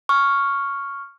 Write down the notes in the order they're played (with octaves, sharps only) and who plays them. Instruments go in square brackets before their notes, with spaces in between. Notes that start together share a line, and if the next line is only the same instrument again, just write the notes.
[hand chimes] C#6 F6